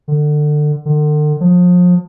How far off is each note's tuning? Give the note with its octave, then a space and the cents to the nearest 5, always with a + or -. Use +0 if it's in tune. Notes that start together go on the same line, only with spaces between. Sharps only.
D3 +25
D3 +40
F3 +35